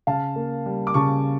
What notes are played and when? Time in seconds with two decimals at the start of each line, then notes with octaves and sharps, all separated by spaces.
0.07 C#3 F5 A5
0.36 A#3
0.66 G3
0.87 D6
0.94 C#3 A5 C#6